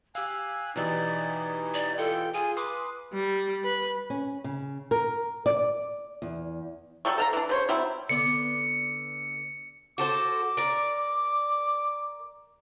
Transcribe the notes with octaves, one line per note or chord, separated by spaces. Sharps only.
G4 F5 G#5 E6 F#6
B2 E3 D#4 G4 D5
D5
F4 A4 G5
F4 G#4 G#5
B4 C6 D6 D#6 C7
G3
B4
C#4
C#3
A#4
D5
E2
F#3 G3 A4 C#6
A4 F5 A#5
E3 D4
C#3 C5 C#5
F#3 G3 C4 E4
D3 B3 D5 C#7
F#4 A4 C5 D6
A#4 D5